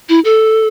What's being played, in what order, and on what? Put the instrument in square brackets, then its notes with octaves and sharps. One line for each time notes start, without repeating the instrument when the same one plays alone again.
[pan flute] E4
A4